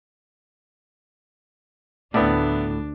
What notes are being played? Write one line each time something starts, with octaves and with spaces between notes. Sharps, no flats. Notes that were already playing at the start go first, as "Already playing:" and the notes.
D2 A2 B3 D4 E4 D5